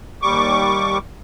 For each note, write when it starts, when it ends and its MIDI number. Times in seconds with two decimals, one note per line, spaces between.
0.22 0.98 39
0.22 0.98 55
0.22 0.98 85
0.22 0.98 86